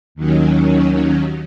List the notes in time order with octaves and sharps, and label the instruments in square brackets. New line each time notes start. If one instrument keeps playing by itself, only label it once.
[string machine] D#2 D#3 F#3 C#4